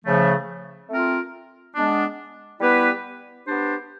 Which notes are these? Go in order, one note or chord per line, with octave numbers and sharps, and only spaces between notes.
C#3 F3 A3
A3 C4 F4 A#4
G#3 B3 D4
G3 B3 E4 G4 B4
B3 D4 G4 C5